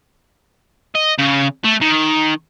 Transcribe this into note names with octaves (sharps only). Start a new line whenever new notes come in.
D#5
C#3
A3
D#3